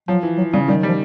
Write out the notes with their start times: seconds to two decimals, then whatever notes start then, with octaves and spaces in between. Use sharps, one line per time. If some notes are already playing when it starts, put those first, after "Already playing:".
0.08 F3 F#3
0.23 E3
0.38 F#3
0.53 C#3 G3
0.68 D#3 G3
0.78 F#3
0.83 F3 G3